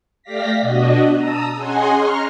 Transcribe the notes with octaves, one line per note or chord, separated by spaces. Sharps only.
A3 G4 D5 F5 A#6 B6
B2 D4 F#4 D#5
A5 A#5 D#6 E6
C#4 G#4 D#5 F#5 G#5 C6
A#5 C6 C#6 F6